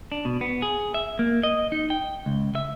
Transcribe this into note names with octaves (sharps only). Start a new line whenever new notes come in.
D4
B2
B3
G#4
E5
A#3
D#5
D#4
G5
C#2
E5